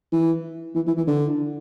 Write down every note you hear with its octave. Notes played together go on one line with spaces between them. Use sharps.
E3
E3
E3
E3
D3